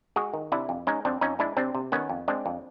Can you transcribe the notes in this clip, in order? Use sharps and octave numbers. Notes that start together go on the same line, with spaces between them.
G#3 F#4 G#4
D#3
C3 D4 E4
F2
G#3 C#4 D#4
F2 C4 D4
F2 C#4 D#4
G#3 D4 E4
C3 C4 D4
C3
D#3 B3 C#4
F2
G#3 C4 D4
F2